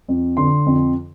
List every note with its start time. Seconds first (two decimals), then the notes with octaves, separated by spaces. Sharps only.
0.08 F2
0.37 D3 C6
0.66 F2